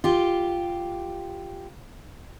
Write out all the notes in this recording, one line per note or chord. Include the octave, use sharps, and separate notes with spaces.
F4 G4